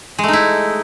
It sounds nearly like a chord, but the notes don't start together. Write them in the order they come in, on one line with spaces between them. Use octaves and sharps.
G#3 A3 D#4 E4